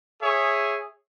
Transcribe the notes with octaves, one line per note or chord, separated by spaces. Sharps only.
G#4 C#5 E5